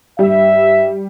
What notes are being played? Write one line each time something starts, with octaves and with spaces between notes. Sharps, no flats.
G2 G3 E5